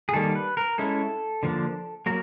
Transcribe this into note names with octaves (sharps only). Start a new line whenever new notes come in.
G#4
D#3 G3 A#3 A4
B4
A#4
G#3 C#4 E4 A4
D3 F3 A#3 D4
F#3 A#3 A#4